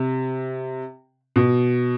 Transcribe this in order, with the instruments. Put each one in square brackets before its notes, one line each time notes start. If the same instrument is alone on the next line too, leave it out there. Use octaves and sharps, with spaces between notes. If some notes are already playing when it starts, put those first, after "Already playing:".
Already playing: [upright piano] C3
B2